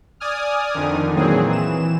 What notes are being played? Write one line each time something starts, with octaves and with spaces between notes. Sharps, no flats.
D5 G#5 D#6 F6
F2 D3 D#3
A#2 E3 F#3 C4 G#4
E3 E7